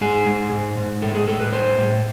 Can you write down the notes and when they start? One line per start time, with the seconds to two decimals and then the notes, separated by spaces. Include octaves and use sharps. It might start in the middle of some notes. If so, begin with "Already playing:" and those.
0.01 G#2 G#4
0.27 G#2
0.52 G#2
0.77 G#2
1.02 A2 A4
1.15 G#4
1.27 A2 A4
1.40 B4
1.52 A2 C5
1.78 A2